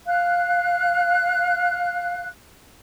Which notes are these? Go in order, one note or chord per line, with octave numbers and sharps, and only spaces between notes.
F5 F#6